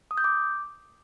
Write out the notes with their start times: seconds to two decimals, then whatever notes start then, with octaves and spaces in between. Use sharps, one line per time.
0.11 D#6
0.18 G6
0.24 D6